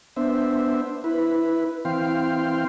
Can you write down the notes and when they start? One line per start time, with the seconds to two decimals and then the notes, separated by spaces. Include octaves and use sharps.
0.16 B3 D4 C5 E5
1.04 E4 B4
1.85 E3 C4 F5 G5 C6